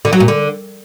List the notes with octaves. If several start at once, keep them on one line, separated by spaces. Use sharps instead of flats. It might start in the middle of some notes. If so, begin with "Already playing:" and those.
D3
F#3
A#2
D3